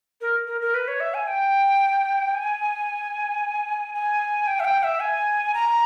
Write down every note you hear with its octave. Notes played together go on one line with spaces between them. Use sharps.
A#4
A#4
A#4
B4
C#5
E5
G#5
G5
G#5
G#5
G5
E5
G5
E5
G#5
A#5